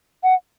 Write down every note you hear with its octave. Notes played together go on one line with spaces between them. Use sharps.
F#5